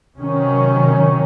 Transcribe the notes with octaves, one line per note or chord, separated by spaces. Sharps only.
C3 D#3 F#3 C#4